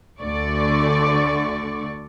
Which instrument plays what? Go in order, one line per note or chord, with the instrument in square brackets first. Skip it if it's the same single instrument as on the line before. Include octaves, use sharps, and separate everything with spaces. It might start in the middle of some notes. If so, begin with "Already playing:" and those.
[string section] D2 D3 A3 D5 C#6